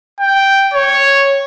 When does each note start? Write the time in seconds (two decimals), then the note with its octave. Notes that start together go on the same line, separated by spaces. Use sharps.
0.20 G5
0.74 C#5